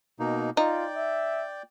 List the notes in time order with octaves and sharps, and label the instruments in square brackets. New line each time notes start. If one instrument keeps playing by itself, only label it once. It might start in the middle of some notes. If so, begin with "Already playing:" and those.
[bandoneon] B2 A#3 D#4
[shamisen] D#4 [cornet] F4 [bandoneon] D5 G5
[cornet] E5